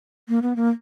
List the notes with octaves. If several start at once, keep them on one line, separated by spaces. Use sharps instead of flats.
A#3
B3
A#3